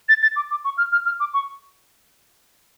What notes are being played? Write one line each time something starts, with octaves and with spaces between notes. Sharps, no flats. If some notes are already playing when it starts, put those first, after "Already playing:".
A6
A6
D6
D6
C#6
F6
F6
F6
D6
C#6